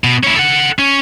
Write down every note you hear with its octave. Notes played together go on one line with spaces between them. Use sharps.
B2
C#4 E4
A4 F#5
C#4